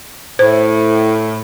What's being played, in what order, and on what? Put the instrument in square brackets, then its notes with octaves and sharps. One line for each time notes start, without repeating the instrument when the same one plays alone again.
[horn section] A2 [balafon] C5